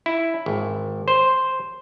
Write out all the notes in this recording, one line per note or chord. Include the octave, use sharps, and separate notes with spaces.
E4
G#1
C5